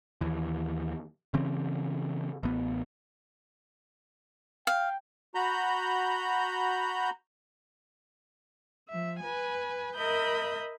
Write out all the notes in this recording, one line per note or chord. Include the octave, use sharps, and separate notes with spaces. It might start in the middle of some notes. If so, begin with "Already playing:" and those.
D#2 E3
C#3 E3 C4 C#4
A1 B3
F5 G5
F#4 A#5 B5 G6
F3 E5
B4 G#5
A#4 D#5 E5 B5 D#6 G6